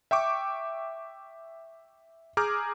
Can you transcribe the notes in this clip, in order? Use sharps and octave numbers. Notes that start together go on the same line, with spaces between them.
E5 G5 C#6 D6
G#4 A#5 D6 F6 G6